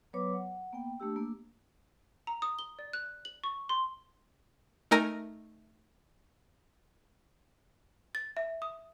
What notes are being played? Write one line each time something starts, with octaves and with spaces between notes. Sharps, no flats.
F#3 B3 B4 C#5 D6
F#5
A#3 B3 G5
A3 D4 G4 E6
A#3
A#5
D#6
G7
D5
F#6
F#7
C#6
C6
A3 D#4 A#4 G#5 A#5 A#6
A6
E5
D#6